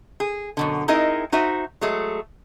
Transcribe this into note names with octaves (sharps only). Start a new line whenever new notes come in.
G#4
F#2 B2 D3
C4 D#4 E4 G#4 A#4 D#5
D#4 F#4 C5 E5
F#3 G#3 A3 G#4